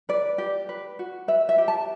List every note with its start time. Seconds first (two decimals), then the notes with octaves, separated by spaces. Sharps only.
0.09 B4 D5
0.38 G4
0.69 B4
0.99 F#4
1.28 B4 E5
1.49 E5
1.58 G4
1.68 A5